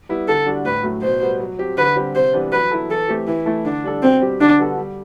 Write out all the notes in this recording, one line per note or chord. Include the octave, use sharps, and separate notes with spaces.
G3 B3 E4
D3 A4
G3 D4 F#4
A2 B4
F#3 A3
B2 C5
G3 B3
F#3
C4 G4
D3 B4
G3 C4 G4
C3 C5
E3 G3 B3 D4
F#3 B4
B3 E4 A4
E3 A4
A3 C4 G4
E3 E4
A3 E4 A4
D3 D4
G3 D4 A4
B2 C4
G3 C4 G4
D3 D4
G3 B3 F#4 A4
G3